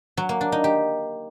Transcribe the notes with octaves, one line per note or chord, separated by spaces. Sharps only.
F#3
A#3
D4
D#4
G4